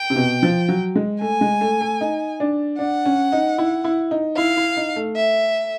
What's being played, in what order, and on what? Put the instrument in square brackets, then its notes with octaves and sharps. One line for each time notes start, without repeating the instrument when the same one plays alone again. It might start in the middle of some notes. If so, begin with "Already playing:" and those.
Already playing: [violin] G5
[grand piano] C3
B2
F3
F#3
G#3
[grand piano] A3 [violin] G#5
[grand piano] G#3
A3
A3
D#4
D4
[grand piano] D4 [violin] F#5
[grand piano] C#4
D#4
E4
E4
D#4
[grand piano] E4 [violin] F5
[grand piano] E4
D#4
A3
[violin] E5